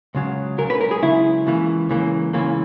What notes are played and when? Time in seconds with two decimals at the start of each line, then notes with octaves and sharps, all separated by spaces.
0.15 C#2 C#3 F#3
0.58 C#2 C#3 F#3 A#4
0.70 B4
0.81 A#4
0.91 G#4
1.02 C#2 C#3 F#3 E4
1.46 C#2 C#3 E3 A#3
1.89 C#2 C#3 E3 A#3
2.33 C#2 C#3 E3 A#3